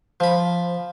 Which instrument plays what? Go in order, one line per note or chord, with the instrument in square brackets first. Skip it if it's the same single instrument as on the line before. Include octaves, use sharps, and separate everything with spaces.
[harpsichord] F3 B5